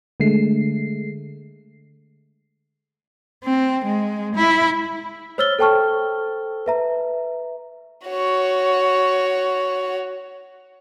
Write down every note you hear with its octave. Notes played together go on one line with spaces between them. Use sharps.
D3 G#3 A3 C7
C4
G#3
E4
C5 C#5 E6 F6 A6 G7
A4 C5 G5 A5 C#6 F6
B4 E5 A#5
F#4 C#5